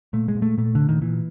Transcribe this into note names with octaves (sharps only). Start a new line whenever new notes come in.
A#2 A3
G#3
A#2
A3
A#2 A3
A#2 D3
D#3
A#2 E3